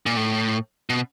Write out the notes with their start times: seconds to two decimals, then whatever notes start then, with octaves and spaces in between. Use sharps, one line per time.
0.06 A#2
0.17 A2
0.90 B2